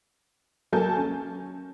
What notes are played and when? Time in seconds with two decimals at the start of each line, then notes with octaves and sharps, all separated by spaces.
0.72 F#3 A#3 A4 G#5 A5 G6
0.97 C#4